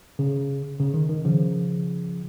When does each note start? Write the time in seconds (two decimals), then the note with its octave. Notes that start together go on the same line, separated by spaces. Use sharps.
0.19 C#3
0.80 C#3
0.94 D#3
1.09 D#3
1.25 C#3 F3